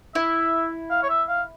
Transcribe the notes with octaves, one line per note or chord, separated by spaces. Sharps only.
E4 E5
F5
C#5
E5
F5